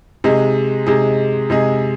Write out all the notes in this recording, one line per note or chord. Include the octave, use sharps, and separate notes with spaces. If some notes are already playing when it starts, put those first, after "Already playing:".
C3 G#3 D#4 G#4
C3 G#3 D#4 G#4
C3 G#3 D#4 G#4